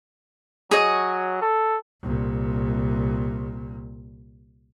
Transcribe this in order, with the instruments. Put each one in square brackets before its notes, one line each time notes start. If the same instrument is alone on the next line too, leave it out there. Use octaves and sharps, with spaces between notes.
[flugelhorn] F#3 [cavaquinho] G#4 C#5 D#5
[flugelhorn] A4
[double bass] C2 A#2